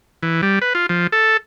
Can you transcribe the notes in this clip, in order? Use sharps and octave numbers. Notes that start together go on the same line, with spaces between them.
E3
G3
B4
F4
F3
A4